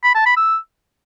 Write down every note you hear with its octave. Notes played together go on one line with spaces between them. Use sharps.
B5
A5
B5
E6